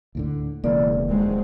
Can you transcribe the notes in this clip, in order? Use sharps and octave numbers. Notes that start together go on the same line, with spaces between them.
D2 A2 D3
E1 C#3 E3 A#3 D5
D#1 F#3 G#3 C4